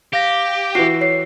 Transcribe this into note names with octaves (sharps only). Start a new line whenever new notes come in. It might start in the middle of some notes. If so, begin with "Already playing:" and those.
G4 F5 A#6
E3 F#4 C7
C#5 C7